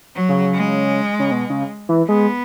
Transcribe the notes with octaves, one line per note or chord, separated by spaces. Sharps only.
F#3
C#3
G#3
C#3
B2
C#3
E3
G#3 B3